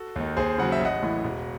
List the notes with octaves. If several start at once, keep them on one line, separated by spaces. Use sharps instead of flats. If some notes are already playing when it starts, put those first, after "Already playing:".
Already playing: F#4 A4
D#2 D#3
D#2 G#4 C5
C#3 F#3 F#5
E5
A1 D#5 F#5
A2 E3
E1